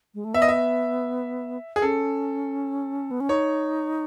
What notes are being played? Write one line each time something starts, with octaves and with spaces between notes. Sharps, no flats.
G#3
A3
B3 E5
D#5
E5
G#4
C#4 A4
B3
C#4
D#4 C#5